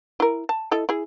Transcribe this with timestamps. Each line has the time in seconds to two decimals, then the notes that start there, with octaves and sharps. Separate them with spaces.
0.20 E4 A#4
0.49 A5
0.71 E4 A4 D#5
0.89 E4 G#4